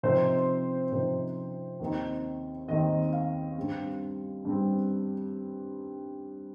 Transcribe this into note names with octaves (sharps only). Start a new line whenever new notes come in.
C3 F3 C4 D#4 C5
C3 F3 C4 D#4 C5
D#2 D#3 C4 D#4
D#2 D#3 C4 D#4 D#5
F5
G2 G3 C4
G2 G3 C4